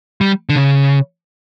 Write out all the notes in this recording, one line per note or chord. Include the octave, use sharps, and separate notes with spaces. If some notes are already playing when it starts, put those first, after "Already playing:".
G3
D3
C#3